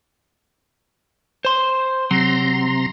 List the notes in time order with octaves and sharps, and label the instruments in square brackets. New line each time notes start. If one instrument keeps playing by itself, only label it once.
[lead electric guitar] C5 C6
[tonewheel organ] C3 A#5 C6 [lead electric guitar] F#3